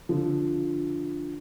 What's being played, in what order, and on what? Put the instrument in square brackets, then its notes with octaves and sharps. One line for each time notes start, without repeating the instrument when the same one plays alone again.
[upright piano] D3 F3